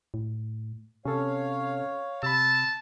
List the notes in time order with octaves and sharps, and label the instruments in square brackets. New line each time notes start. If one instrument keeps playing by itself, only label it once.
[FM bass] A2
[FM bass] C3 [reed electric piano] C#4 A4 [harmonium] C#5 F5
[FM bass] C3 [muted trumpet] A5 [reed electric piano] B5 E6